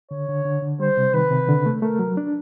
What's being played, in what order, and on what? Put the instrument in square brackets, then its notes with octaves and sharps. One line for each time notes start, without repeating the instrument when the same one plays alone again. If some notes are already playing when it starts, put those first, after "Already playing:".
[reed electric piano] D3 [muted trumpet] C#5
[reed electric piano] D3
D3
D3
[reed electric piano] G3 [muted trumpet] C5
[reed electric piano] C3
[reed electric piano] D#3 [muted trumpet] B4
[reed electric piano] C3
D3
A3
[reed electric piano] A3 [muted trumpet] A#4
[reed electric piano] F#3
D4